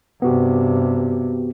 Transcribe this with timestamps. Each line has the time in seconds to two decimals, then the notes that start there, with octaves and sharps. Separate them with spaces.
0.22 G2 C3 B3 F#4 G4